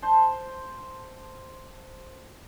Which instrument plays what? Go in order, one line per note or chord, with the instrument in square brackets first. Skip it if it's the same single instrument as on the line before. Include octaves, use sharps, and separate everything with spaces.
[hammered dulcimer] C5 A5 C6